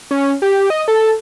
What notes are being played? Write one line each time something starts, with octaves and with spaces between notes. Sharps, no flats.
C#4
G4
D#5
A4